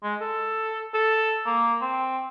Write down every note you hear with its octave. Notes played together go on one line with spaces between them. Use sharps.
G#3
A4
A4
A#3
C4